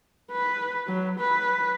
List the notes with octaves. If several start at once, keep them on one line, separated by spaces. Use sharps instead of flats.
B4
F#3
B4